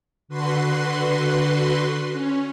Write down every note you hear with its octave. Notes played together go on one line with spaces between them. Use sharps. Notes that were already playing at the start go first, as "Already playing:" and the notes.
D3 F#4 B4 C6
C#4